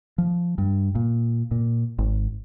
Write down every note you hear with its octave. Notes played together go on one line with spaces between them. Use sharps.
F3
G2
A#2
A#2
G#1